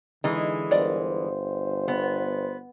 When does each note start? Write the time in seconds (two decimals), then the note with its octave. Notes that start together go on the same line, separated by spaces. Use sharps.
0.24 D3 E3 G#3 D#4
0.71 G1 A#4 C5 D5 D#5
1.88 B3